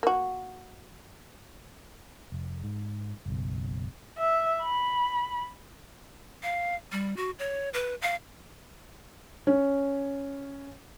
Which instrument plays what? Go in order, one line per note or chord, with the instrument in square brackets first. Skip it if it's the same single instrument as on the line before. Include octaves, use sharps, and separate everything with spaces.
[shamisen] A#3 F#4
[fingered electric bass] F1
G#2
F#1 B1
[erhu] E5
B5
[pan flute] F5
G3
F#4
C#5
B4
F5
[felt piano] C#4